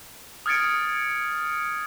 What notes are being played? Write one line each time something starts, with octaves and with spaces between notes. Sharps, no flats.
D#6 F6 G#6 A6 C#7 D7